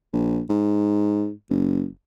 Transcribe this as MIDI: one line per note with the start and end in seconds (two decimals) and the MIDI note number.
0.13 0.41 34
0.49 1.31 44
1.50 1.86 30